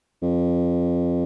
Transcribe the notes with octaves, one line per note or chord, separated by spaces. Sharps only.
F2